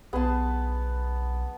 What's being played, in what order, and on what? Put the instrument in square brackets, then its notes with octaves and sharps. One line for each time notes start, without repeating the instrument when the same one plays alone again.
[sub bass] B1 [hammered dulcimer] B3 A5 [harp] G#4 B5 C6